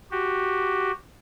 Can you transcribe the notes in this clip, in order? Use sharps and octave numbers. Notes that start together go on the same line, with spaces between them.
F#4 G4